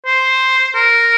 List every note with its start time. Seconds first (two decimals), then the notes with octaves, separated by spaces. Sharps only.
0.06 C5
0.75 A#4